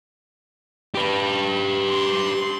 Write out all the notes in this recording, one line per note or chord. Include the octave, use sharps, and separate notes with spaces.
G4 B4
C6